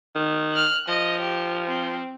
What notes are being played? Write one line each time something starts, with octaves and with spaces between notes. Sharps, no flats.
D#3
F6 F#6
F3 D#5
G4
C4